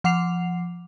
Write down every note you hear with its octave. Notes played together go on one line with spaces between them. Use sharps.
F3 F#5 D6 C7 F7